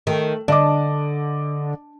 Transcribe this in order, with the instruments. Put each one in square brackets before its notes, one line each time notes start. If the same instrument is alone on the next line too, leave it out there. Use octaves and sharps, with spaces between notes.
[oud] D#3 [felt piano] A3
[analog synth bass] D3 [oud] D4 [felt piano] D5 D#5 D6